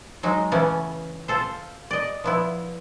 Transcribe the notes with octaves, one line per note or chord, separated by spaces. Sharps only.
F#3 G#3 D#4
C#3 E3 A3 B3 C#4
F4 A4 C5
D5 D#5
F3 B3 E4